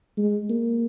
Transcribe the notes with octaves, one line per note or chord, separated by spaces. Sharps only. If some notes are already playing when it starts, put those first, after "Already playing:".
G#3
A#3